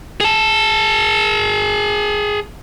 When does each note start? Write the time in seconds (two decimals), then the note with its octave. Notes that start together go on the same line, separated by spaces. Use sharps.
0.21 G#4 A5